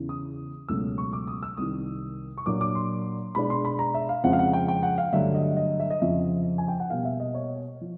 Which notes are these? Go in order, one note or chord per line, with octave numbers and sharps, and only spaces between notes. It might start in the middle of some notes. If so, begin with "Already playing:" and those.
Already playing: E2 C#3 E3
D#6
C#2 B2 F#3 A3 C#4 E6
C#6
D6
D#6
E6
C2 C3 D#3 D#6
C#6
A#2 F#3 A#3 D4 D6
D6
C6
B2 G#3 B3 D4 B5
C6
B5
A#5
E5
F5
F2 C#3 F3 G#3 C4 F#5
F5
F#5
G5
G5
F#5
F5
G2 D3 F#3 A3 E5
D#5
D#5
E5
D#5
F2 C#3 F3 E5
G#5
G5
F#5
B2 G3 A#3 F5
E5
D#5
C#5
F3